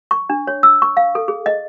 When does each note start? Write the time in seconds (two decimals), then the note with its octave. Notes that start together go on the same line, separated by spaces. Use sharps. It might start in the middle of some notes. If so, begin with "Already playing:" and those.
0.11 C#6
0.30 D4
0.47 C#5
0.63 E6
0.82 C#6
0.97 F5
1.15 A4
1.28 G#4
1.46 D#5